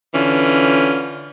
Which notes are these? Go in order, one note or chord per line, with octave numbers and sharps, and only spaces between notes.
D3 E3 C#4 F4